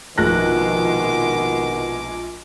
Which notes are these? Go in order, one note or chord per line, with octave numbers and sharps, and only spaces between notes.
A#1 B2 D#3 G#3 D6 F#6 A#6